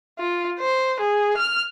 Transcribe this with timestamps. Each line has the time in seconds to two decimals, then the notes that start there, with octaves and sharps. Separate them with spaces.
0.19 F4
0.60 C5
1.00 G#4
1.37 F6